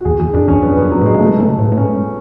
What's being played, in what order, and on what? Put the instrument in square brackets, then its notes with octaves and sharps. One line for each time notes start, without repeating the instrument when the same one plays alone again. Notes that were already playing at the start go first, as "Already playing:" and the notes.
[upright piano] F#4
[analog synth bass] E2 [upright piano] G#4
[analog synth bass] E2 [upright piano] G#4
[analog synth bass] F#2 [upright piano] D4
[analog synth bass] E2 [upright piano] C#4
[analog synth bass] F#2 [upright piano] B3
[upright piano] B3
[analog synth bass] F#2
[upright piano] F#3
[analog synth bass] A2
[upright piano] G#3
[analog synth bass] C#3
[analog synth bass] B2 [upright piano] A3
[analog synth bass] C#3 [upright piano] A3
[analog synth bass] A2 [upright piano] B3
[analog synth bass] A2
[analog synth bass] G#2 [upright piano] C#4